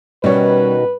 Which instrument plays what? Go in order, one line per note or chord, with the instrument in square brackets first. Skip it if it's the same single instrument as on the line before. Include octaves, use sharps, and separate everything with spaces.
[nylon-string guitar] B2 D#3 [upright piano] G3 C#4 C#5 [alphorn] B4